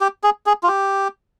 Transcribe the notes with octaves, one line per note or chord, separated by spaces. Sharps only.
G4
G#4
G#4
F4
G4